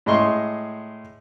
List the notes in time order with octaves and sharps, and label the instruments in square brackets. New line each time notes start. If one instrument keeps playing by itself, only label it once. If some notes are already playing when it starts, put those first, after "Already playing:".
[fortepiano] A2 G#3 D#5 C6 C#6